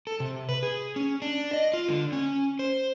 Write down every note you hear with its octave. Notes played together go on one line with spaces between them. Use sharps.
A4
C3
B4
G#4
C#4
D4
D#5
F4
D3
C#4
C5